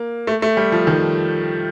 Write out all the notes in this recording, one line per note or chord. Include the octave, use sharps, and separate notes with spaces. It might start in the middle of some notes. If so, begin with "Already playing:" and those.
Already playing: A#3
A3
A3
G3
F3
D#3